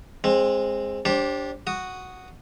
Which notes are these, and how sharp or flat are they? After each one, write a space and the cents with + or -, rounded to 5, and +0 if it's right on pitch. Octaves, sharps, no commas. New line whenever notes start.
G#3 -10 C4 +15
D4 -20 G4 +0 C5 +30
F#4 +0 D#6 +0